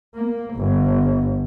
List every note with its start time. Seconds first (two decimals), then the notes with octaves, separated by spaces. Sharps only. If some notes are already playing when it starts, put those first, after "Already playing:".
0.15 A#3
0.54 G1